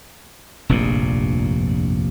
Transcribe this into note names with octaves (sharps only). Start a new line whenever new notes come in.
F1 A#1 G2 A#2